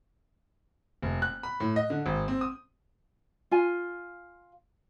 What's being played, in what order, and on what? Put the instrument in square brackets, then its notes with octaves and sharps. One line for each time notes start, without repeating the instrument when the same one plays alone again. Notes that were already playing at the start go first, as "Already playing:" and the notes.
[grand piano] F1
F#6
B5
A2
D#5
D3
G#1
C4
D#6
[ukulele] F4 G#5